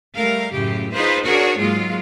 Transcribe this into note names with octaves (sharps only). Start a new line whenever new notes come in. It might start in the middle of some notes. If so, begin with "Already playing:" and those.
G3 A3 A#4 F5
F#2 A2 C#3 G4
D#4 F4 G#4 B4 C5
D4 F#4 G#4 A#4 C#5
G#2 F#3 G#3 A#3 F4